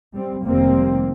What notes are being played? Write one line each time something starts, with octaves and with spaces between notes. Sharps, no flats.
G3 C4
F1 D#3 G3 A#3 C4